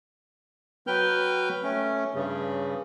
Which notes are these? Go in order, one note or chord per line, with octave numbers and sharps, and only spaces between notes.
F#3 B4 G5 F6 G6
A3 C#4
G2 C#3